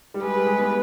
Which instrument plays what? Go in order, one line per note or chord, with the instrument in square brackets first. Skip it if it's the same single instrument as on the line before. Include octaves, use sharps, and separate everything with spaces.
[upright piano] G3
[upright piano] G#3 [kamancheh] B4
[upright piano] G3
G#3
B3